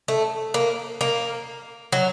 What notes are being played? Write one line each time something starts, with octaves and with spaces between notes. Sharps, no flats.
A3
A#3
A#3
F#3